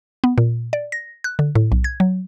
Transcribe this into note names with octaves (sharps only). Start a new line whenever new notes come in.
B3
A#2
D5
A#6
F#6
D3
A2
B1
G#6
F#3